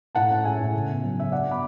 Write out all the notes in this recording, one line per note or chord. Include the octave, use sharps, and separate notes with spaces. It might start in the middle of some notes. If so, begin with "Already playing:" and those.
A2 F#5 A5
C#4
G#3 E5 G#5
A2
C#3
B3
F#3
C#3 E5
D4 D5 F#5
B3 B5 D6